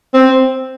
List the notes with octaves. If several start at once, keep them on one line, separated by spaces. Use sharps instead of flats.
C4